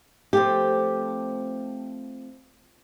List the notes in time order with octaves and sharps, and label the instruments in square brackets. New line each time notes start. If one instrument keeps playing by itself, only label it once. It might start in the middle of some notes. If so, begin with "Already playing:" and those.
[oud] F3 A3 C4 [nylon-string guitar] G4